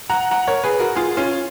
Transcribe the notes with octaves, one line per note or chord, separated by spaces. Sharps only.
F#5 A#5
F#5 A#5
A#4 C#5
G#4 B4
F#4 A#4
F4 G#4
C#4 F4